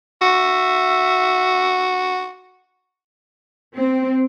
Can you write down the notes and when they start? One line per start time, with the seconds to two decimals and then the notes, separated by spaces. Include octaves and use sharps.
0.22 F#4 E5
3.75 C4